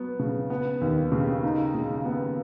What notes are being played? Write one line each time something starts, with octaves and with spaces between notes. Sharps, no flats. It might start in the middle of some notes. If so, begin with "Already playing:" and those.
Already playing: F#3 B3
C#3
B3
D#2
C#3
D#4
C#3
B3